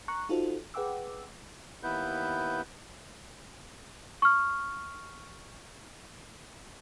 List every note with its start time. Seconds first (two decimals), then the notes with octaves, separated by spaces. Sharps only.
0.08 A#5 C#6 F#6
0.29 D#4 F4 F#4 A4 C5
0.74 G#4 B4 F#5 G5 D6 E6
1.83 D#2 B3 E4 B4 G6
4.22 C#6 F6